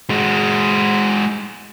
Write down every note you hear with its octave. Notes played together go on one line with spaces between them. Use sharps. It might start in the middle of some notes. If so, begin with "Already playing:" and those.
G#3 F#4